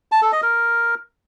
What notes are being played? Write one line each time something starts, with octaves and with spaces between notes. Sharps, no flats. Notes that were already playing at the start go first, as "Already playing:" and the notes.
A5
A4
D#5
A#4